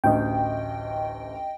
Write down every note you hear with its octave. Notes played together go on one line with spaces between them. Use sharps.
A1 D2 D#5 G5